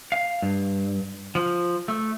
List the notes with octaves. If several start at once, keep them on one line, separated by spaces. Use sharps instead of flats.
F5
G2
F3
A3